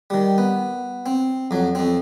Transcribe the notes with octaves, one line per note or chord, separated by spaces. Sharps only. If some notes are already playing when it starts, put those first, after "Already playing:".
D#3 G3
B3
C4
F2 F#3
F2 C4